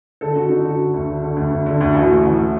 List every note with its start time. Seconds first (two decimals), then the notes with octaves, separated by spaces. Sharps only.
0.21 D3 A4
0.35 D3 F#4
0.50 D3 D#4
0.64 D3 F#4
0.79 D3
0.94 D2
1.07 D3
1.22 D3
1.36 D2
1.51 D2
1.66 D3
1.81 D2
1.95 A1 F#4
2.09 A2
2.24 A1
2.38 A2